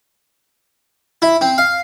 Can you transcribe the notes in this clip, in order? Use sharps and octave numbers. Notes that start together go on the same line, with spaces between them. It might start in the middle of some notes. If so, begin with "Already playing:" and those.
E4
C4
F5